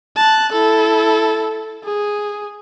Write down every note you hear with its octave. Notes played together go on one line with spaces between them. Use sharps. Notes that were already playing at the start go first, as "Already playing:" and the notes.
A5 F#6
E4 A4
G#4